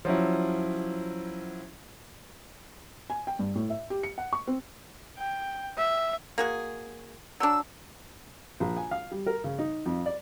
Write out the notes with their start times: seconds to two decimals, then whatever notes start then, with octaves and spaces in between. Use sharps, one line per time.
0.05 F3 F#3 C#4 E4
3.10 G#5
3.27 G5
3.39 G2
3.55 A2
3.70 E5
3.90 G4
4.03 C#7
4.18 F#5
4.33 C#6
4.47 C4
5.18 G5
5.78 E5
6.38 A#3 F#4 G#4
7.40 F#3 D4 E6
8.60 A#1
8.77 G#5
8.91 F5
9.11 G3
9.26 A#4
9.44 C#3
9.59 D#4
9.86 F2
10.06 D5